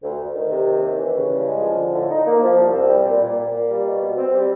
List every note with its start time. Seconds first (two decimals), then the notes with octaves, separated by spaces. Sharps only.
0.02 D2
0.18 D2
0.34 D#3
0.50 C3
0.66 D#2
0.82 D#2
0.97 E3
1.15 C#3
1.29 G2
1.45 G#3
1.61 F3
1.78 D3
1.94 A2
2.10 D#4
2.25 A#3
2.42 F3
2.57 C2
2.73 C4
2.89 G3
3.05 A#2
3.21 A#2
3.38 A#2
3.54 A#3
3.68 G3
3.85 B2
4.01 B2
4.16 C4
4.33 G3